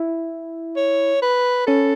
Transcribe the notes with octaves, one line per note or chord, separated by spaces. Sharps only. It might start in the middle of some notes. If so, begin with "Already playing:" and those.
Already playing: E4
C#5
B4
C#4 A4